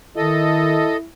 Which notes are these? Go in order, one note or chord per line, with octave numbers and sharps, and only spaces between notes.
D#3 E4 A4 D#5